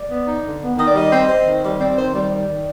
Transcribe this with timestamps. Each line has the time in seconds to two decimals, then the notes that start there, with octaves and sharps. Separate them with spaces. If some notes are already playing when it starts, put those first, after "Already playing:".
Already playing: D5
0.10 B3
0.27 D#4
0.44 D3
0.61 B3
0.78 D#3 D#5
0.87 D5
0.95 G3 D#5
1.12 C4
1.29 C4
1.46 D#3
1.63 G3
1.80 C4 D5
1.97 D#3 C5
2.14 G3 D5
2.32 D#3 D5
2.48 D#3